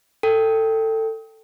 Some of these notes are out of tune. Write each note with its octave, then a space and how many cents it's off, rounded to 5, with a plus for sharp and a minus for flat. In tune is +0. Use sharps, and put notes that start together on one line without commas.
A4 +20 G5 +0